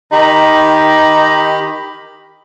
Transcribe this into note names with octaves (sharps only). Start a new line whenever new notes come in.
D#3 D#4 G4 B5